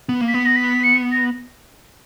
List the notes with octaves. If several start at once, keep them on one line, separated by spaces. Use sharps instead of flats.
B3
A#3
B6
B3
A#6
B6
C#7
A#6